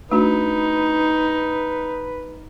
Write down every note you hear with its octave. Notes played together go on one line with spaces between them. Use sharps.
A3 D4 D#4 F#4 B4